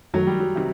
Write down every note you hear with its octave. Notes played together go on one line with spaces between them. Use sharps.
F#2 D#3 F#3 A3
G3
F#3
C3 D#3